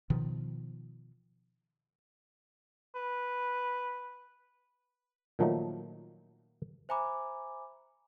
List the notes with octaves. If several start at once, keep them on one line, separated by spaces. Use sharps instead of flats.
B2 D#3 F3
B4
A#2 D#3 F3 F#3 A3 D#4
C5 E5 G#5 A#5 B5 D6